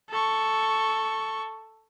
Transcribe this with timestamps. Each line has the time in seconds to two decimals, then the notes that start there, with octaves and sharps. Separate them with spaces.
0.10 A4 C#6